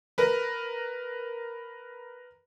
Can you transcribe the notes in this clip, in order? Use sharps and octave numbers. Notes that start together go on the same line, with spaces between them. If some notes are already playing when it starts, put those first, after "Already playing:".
A#4 B4